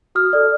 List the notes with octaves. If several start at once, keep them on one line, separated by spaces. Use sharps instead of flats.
F#4 D#6 F6
A4 D5